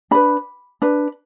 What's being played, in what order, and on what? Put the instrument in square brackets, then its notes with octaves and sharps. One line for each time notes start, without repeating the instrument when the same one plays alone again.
[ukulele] D4 B4 B5
D4 B4